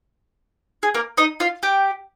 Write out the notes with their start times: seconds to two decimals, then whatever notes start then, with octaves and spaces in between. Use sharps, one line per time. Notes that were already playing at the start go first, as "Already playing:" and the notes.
0.83 G#4
0.94 A#3 A#4
1.17 D#4 D#5
1.40 F4 F5
1.63 G4 G5